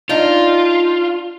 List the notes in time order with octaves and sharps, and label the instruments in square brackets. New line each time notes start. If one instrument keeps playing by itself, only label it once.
[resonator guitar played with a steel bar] D4 D#4 [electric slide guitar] F4